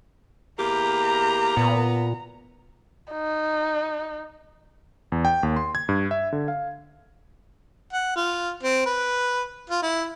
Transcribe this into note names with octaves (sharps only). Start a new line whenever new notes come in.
E2 A#3 G4 A#5
A#2 B3
D#4
E2
G5
D#2
C6
G#6
G2
E5
D3
F5
F#5
F4
C4
B4
F4
E4